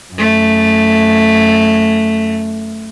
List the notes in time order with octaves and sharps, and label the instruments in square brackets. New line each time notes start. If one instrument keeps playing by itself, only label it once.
[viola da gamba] F#2 A3